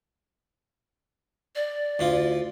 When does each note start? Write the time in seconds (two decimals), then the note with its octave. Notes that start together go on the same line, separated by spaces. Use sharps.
1.55 D5
1.99 D2 E4 F4